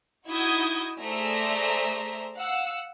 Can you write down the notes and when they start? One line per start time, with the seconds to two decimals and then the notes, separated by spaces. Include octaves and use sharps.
0.28 D#4 E4 F#4 D#6 G6 G#6
1.00 A3 G#4 C5 D5 E5 A#5
2.36 F5 F#5 E6